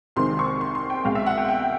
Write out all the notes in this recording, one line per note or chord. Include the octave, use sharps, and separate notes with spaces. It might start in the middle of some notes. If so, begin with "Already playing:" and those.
C2 C3 D#3 G#3 C4 C6
C#6
C6
C6
G5
C2 B2 G#3 F5
E5
F#5
G5
G5